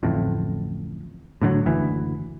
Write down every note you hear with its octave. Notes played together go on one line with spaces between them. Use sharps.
D1 A1 F2 A2
A2 D3 D#3 F#3
F#1 D2 E3